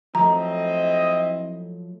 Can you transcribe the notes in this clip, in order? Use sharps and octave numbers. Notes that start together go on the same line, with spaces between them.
F3 F#3 A3 C4 E4 D#5 A#5